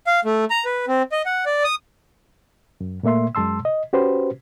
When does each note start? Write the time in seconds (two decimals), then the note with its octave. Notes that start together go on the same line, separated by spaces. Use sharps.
0.07 F5
0.25 A3
0.50 A#5
0.65 B4
0.88 C4
1.12 D#5
1.26 F#5
1.46 D5
1.64 D#6
2.81 F#2
3.03 A#2 A3 A#3 E5 C6
3.35 F#2 G#3 A5 C6 E6
3.65 D#5
3.93 C#4 F#4 G4 B4 C5